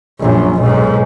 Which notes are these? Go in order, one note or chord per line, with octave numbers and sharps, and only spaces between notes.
A#1 F#2
B1 G#2